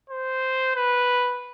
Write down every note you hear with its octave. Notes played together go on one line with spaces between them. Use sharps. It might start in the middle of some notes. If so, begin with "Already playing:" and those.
C5
B4